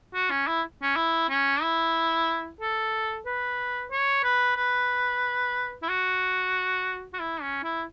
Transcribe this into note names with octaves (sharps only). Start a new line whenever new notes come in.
F#4
C#4
E4
C#4
E4
C#4
E4
A4
B4
C#5
B4
B4
E4
F#4
F#4
E4
C#4
E4